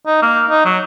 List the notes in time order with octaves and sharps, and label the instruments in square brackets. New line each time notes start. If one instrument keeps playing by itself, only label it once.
[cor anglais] D#4
A#3
D#4
F#3